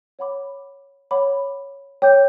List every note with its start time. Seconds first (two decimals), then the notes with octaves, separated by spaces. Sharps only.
0.19 C#5 F#5 B5 D6
1.11 C#5 F#5 B5 D6
2.02 C#5 G5 D6 G6